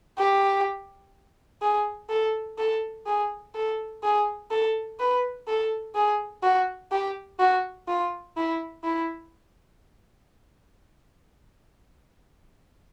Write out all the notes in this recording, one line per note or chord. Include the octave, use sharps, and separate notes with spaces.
G4
G#4
A4
A4
G#4
A4
G#4
A4
B4
A4
G#4
F#4
G4
F#4
F4
E4
E4